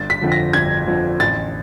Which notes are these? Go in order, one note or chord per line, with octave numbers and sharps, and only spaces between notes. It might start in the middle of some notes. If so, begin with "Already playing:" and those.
Already playing: G1 A6
B6
F2 D3 F3
A#6
G1 G#6
F2 D3 F3
A1 A6